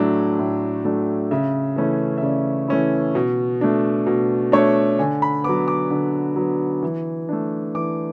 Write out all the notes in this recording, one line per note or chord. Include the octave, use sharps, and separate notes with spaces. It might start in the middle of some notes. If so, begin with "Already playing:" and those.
Already playing: A2 F#3 A3 D4
A2
F#3 A3 D4
C#3 E5
E3 A3 C#4 E4
E5
C#3 D5
E3 A3 C#4 E4
B2
A3 D4
B2
A3 D4 C#5
D3 G#5
B5
F#3 B3 D6
D6
D3
F#3 B3
E3
A3 D4
E3 D6